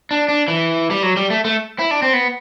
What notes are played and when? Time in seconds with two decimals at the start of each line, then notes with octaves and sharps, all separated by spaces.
0.11 D4
0.29 D4
0.48 E3
0.91 G3
1.03 F#3
1.17 G3
1.30 A3
1.45 A3
1.79 E4
1.91 D4
2.02 C4
2.13 B3